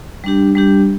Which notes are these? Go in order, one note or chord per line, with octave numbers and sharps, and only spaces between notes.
G3 D4 G4
G3 D4 G4